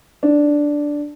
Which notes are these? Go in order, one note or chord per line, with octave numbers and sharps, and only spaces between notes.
D4